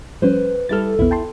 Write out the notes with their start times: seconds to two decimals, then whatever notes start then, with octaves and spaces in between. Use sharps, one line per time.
0.22 F3 G3 C#4 B4 C5
0.69 G3 E4 A4 F6 A6
0.99 A#1 E2 B3 E4
1.11 G5 A5 C6